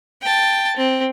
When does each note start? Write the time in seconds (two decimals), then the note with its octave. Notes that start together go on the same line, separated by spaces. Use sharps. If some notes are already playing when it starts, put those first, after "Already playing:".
0.22 G5 A5
0.77 C4